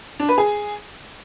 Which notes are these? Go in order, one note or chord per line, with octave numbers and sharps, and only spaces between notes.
D4
B4
G#4